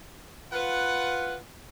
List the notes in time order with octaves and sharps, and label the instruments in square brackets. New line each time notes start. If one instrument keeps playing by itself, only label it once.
[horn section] F4 B4 F#5